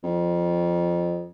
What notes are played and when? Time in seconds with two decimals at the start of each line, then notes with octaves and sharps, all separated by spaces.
0.03 F2